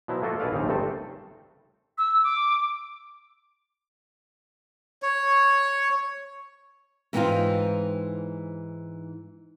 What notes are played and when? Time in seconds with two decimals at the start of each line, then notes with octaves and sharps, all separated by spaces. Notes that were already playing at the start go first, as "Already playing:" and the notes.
0.08 B2 F3 F#3 E4
0.23 A3 A#3 F4 F#4 A4 A#4
0.40 B1 G#4 A4 B4 D5 F5
0.52 A#1 D#2 C#3 C4 D#4
0.68 G1 C3 G3 A3 C4 A4
1.98 E6
2.24 D6
5.02 C#5
7.13 G#2 E3 B3 C4 D#4 F4